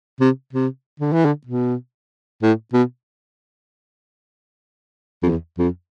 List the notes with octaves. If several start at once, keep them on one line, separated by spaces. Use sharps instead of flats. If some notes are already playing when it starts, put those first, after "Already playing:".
C3
C3
D3
E3
D3
B2
A2
B2
F2
E2
F2